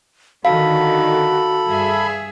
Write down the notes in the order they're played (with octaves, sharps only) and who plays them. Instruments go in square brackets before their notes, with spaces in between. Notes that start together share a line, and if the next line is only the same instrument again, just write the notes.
[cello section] D3 D#3 [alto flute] F#4 [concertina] A4 B5 [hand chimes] F5
[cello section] G2 G#4 E5